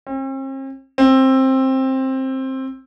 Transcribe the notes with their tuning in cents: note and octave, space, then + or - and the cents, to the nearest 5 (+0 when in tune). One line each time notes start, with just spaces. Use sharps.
C4 +45
C4 +15